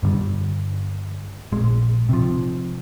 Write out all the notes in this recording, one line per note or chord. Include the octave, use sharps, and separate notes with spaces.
G2 D3 G3
A#1 G#3
C3 F3